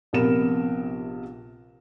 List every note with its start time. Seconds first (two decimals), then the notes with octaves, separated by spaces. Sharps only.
0.13 A#1 C3 B3 A#4 E7